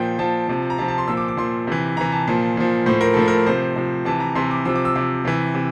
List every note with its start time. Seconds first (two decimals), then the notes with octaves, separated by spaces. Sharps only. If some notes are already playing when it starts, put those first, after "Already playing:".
Already playing: A#2 F3 G5
0.18 A#2 F3 A5
0.48 C3 F3
0.70 A#5
0.78 C3 F3 A5
0.88 A5
0.98 C6
1.07 A#2 F3 E6
1.17 D6
1.28 D6
1.37 A#2 F3 C6
1.67 C3 E3
1.97 C3 E3 A#5
2.12 A5
2.27 A#2 F3
2.57 A#2 F3
2.86 A2 F3 C5
3.01 A#4
3.14 A2 F3 A4
3.28 A#4
3.46 C3 F3 C5
3.76 C3 F3
4.05 C3 E3 A5
4.20 A#5
4.35 C3 E3 C6
4.51 D6
4.65 C3 F3 E6
4.76 D6
4.85 E6
4.95 C3 F3 D6
5.25 C3 E3
5.55 C3